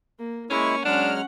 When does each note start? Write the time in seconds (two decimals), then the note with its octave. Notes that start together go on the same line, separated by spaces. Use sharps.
0.19 A#3
0.50 G#3 A#3 C#4 E4 C#6
0.85 F#3 G#3 C#4 D4 F#5 F6